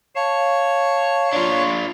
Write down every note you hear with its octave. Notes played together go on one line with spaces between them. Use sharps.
C#5 F5 A5
D4 F4